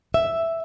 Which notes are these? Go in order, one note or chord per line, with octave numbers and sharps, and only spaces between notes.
E5